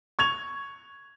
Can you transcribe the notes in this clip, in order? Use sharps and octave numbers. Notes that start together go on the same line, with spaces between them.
C#6 G#6 F7